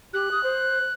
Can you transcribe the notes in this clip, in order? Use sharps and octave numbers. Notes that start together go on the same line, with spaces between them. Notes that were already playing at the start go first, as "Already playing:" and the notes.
G4 F#6
D#6
C5